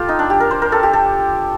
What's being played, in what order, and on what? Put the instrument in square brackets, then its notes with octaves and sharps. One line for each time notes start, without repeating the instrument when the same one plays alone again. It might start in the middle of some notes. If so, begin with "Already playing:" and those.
Already playing: [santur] F4 G4 A4
D#4
D4
G4
A#4
C5
A#4
A4
G4
A4